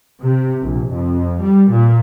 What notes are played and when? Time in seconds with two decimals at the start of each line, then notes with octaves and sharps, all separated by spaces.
0.23 C3
0.63 A#1
0.93 F2
1.42 G3
1.71 A#2